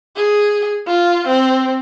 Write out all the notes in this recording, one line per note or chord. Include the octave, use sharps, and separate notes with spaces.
G#4
F4
C4